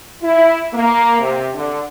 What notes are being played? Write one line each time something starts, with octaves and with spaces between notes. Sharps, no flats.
E4
A#3
C3
D3